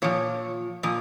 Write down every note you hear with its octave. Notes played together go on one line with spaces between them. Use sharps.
A#2 F3 C#5
A#2 F3 D#5